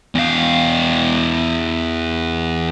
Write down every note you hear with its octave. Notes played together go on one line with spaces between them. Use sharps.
E2 F5